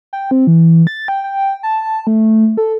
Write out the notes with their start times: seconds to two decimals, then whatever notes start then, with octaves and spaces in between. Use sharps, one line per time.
0.13 G5
0.31 C4
0.47 E3
0.87 A6
1.08 G5
1.24 G5
1.63 A5
2.07 A3
2.57 A4